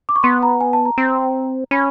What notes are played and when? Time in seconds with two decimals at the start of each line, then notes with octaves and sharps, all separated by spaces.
0.09 D6
0.16 C#6
0.23 B3 C6
0.43 A#5
0.61 G#5
0.73 A5
0.85 A#5
0.98 C4
1.71 C#4 B5